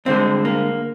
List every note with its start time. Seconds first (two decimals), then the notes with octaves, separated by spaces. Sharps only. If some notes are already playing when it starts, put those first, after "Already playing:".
0.05 G2 D3 G#3 C4
0.45 A#3